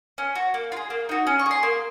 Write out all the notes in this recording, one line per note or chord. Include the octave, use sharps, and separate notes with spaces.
C#4
F#4
A#3
F4
G#4
A#3
D#4 F#4
C#4
C#6
G#4 C6
A#3